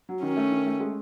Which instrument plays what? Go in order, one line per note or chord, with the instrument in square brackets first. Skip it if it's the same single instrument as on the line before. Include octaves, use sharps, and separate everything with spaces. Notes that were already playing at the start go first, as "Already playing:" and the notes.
[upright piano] F#3
[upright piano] D#3 [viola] C#4
[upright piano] A3
D#3
A3
G#3